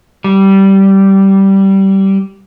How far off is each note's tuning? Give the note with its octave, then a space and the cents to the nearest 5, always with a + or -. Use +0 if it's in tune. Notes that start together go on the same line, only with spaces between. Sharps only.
G3 -15